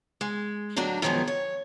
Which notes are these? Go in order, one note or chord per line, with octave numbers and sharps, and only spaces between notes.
G#3
A2 D3 F#3 D4 D#4
F#2 D#3 F3 G#3 B3
C#5